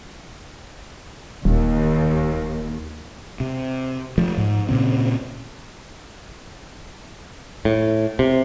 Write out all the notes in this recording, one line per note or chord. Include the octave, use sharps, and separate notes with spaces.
D#1 D#2
C3
F3 A3
G#2
A#2 C#3 C4
A2
C3